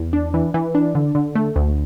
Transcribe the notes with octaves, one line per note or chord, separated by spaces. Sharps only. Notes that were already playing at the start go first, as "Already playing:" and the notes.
Already playing: E2
D4
E3
E3
D4
D3
D3
A3
D2